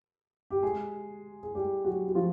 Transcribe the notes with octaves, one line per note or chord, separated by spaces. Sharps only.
G4
G#3 G#4
G#4
G3 G4
F#3 F#4
F#4
F3 F4